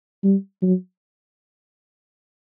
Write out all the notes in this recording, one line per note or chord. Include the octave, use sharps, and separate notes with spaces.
G3
F#3